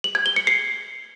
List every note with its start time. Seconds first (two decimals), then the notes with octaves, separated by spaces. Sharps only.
0.04 F#7
0.15 G#6
0.26 G7
0.36 C#7
0.47 C7